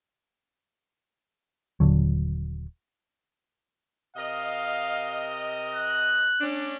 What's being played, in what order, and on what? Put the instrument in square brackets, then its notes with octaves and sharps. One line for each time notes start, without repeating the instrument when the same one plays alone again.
[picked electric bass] D#1 C#2 D3 F#3
[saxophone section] C3 A#4 D#5 [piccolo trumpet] F5
[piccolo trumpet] F#6
[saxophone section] A3 C#4 D4